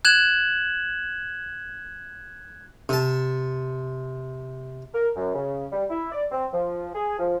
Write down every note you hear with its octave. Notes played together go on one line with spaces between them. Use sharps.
F#6 G#6 E7 F#7
C3 A5
A#4
F#2
C#3
G3
E4
D5
C4
F3
G#4
F3